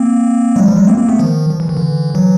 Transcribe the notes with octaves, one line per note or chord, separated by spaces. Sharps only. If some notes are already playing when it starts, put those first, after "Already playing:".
Already playing: A#3 C4
F#3 G#3
F3 G3
F#3 G#3
A#3 C4
A#3 C4
A3 B3
D#3 F3
F3
E3
D#3
D3 E3
E3 F#3